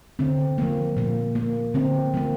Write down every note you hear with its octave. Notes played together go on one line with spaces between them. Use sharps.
D3 C4
F3 A#3
A#2 A#3
A#3
D3 C4
F3 A#3